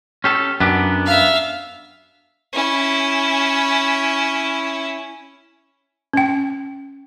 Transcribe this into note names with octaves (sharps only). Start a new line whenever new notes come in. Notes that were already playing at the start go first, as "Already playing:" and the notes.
C#4 G4 A4
F#2 B3 D4 G4
E5 F5
C#4 E4
C#4 G5